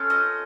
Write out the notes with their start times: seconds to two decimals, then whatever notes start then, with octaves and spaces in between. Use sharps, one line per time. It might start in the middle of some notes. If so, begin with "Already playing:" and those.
Already playing: A3 C#4 F4
0.10 D#5